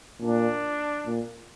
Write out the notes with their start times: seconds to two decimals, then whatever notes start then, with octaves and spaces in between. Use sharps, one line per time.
0.22 A#2 D4
1.07 A#2